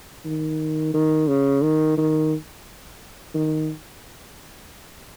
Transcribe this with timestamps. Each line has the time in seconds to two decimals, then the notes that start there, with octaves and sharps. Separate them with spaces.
0.25 D#3
0.94 D#3
1.28 C#3
1.63 D#3
1.97 D#3
3.35 D#3